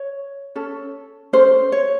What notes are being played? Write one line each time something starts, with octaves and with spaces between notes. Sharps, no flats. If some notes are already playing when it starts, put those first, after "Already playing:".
Already playing: C#5
C#4 A4
C#4 A4 C5
C#5